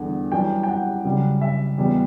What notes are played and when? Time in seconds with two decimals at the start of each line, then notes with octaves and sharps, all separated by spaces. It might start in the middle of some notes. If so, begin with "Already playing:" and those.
Already playing: E2 D3 G3 F#5
0.32 F#2 E3 G3 G5
0.63 G5
0.69 F#5
1.04 F#2 C#3 G3
1.41 E5
1.78 E2 B2 G3